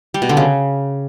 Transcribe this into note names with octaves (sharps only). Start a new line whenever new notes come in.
G3
B2
D3
C#3